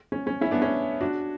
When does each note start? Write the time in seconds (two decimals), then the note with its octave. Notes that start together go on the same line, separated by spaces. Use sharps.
0.12 C#4
0.27 C#4
0.41 C#4 E4
0.51 B3 D4
0.62 C#4
1.01 D4 F#4